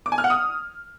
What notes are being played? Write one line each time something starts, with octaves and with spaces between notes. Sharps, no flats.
D6
G#5
F6
F#5
D#6